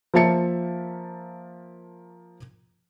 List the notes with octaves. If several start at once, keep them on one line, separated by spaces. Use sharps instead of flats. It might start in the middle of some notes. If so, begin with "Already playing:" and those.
F3 A#3 E5 A5 C#7